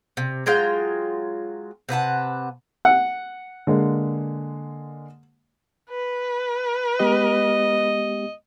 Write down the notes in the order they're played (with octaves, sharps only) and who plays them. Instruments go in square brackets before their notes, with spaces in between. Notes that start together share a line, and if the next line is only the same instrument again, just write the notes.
[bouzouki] C3
F#3 G#3 F4 G5
C3 B4 F#5 A5
[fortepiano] F#5
[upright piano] D3 G#3 A#3
[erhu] B4
[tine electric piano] G#3 B3 G4 [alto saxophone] D#5